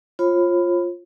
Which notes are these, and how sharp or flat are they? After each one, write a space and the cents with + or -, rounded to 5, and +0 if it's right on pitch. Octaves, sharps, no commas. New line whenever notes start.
F4 +0 C#5 -45 B5 +15